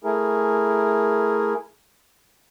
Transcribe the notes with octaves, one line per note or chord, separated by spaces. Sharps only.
A3 E4 G#4 A#4